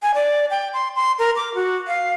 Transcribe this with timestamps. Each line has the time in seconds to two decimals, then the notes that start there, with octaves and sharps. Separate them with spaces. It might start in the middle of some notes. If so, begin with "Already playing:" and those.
0.02 G#5
0.14 D5
0.50 G5
0.74 C6
0.96 C6
1.19 A#4
1.36 D6
1.55 F#4
1.87 F5